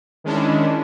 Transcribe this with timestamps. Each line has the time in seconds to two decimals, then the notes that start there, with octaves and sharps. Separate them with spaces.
0.24 D#3 G#3 C#4 D4 E4